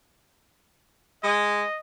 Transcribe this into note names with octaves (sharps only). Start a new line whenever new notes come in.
G#3 D#5